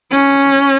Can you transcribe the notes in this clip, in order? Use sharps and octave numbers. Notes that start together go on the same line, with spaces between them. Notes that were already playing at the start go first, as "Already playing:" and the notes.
C#4